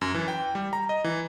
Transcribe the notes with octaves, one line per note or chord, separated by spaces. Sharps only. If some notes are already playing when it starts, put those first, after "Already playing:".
F#2
E3
G5
G3
A#5
D#5
E3